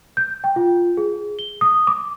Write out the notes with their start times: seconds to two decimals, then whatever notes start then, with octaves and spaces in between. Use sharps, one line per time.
0.17 G6
0.44 G5
0.56 F4
0.97 G#4
1.39 G7
1.61 D#6
1.87 D6